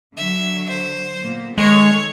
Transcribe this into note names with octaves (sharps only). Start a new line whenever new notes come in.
D3 F#3 E5
C5
A#2 A#3 B3
D#3 G#3 G#4 A4 C#5